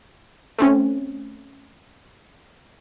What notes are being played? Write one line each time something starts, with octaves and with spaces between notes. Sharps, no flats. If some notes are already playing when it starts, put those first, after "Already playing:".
A3 C4 C#4